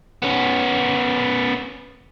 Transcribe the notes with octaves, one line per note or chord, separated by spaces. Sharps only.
B3 C#4